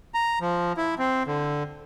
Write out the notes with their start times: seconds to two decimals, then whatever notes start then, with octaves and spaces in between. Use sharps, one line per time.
0.14 A#5
0.41 F3
0.77 E4
0.99 C4
1.27 D3